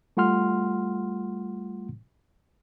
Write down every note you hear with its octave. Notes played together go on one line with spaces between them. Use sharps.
G3 A3 F4 F#5 C6 F6